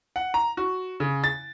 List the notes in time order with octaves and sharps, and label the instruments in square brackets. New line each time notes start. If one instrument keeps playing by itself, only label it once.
[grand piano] F#5
A#5
F#4
C#3
A6